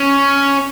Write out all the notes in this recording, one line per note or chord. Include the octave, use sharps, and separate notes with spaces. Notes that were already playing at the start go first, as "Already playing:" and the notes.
Already playing: C#4